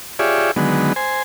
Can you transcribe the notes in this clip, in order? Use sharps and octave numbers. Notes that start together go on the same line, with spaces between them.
F4 G4 G#4 C#5 D5 E5
D3 D#3 F#3 G#3 B3
C5 G#5